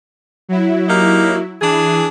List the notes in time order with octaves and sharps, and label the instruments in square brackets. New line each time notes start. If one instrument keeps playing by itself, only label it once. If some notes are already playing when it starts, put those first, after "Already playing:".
[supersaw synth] F#3 E4
[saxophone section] A#3 D#4 G4
[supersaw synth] E3 [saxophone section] D4 G#4